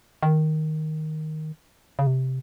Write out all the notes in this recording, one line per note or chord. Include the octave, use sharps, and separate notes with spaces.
D#3
C#3
C3